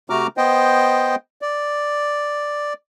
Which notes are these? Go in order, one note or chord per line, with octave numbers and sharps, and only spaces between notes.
C3 A3 F#4 A#5 D6 F6
B3 C5 D#5 G5
D5